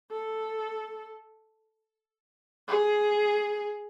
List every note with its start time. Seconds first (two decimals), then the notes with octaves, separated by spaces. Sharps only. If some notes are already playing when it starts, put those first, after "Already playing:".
0.11 A4
2.68 G#4